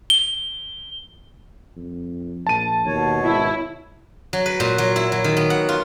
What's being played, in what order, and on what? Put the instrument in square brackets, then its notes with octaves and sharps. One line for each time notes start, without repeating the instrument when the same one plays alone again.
[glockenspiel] G7
[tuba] F2
[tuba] A#1 [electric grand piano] A5 D#7
[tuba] D#2 [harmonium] B2 C#5
[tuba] G#1 [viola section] E4
[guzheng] F#3
B4
A#2
F#3
E4
F#3
D#3
B3
F#5
F4